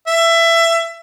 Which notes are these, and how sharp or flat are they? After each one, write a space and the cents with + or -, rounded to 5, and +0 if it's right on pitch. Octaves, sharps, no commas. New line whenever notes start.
E5 +20